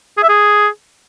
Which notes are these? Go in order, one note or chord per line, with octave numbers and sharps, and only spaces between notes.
G#4
E5
G#4